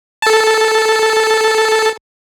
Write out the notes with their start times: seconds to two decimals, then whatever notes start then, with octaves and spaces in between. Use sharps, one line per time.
0.22 A4 A5